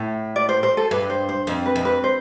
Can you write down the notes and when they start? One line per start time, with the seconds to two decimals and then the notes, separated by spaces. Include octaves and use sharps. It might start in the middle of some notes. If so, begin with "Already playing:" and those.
Already playing: A2
0.36 D5
0.49 C5
0.63 C5
0.77 A4
0.91 G2 B4
1.10 C5
1.29 C5
1.47 F2
1.66 B4
1.76 F2
1.85 B4
2.04 C5